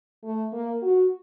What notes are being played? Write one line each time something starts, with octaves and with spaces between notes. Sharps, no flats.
A3
A#3
F#4